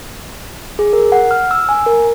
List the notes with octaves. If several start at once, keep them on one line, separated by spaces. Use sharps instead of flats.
G#4
A#4
F#5
F6
E6
G#5
A#4